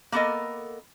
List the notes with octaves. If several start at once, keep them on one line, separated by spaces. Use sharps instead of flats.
A#3 B3 A4 A#4 D#5